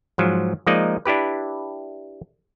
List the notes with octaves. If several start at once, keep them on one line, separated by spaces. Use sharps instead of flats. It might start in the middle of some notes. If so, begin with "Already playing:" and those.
G#2 F3 F#3
F3 G#3 A#3 D#4 D5 D#5
D4 E4 G4 B4